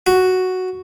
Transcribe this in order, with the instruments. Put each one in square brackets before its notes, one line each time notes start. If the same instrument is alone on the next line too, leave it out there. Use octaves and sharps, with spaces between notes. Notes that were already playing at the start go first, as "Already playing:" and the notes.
[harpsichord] F#4